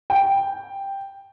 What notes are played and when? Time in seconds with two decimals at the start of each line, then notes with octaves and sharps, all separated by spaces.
0.10 G5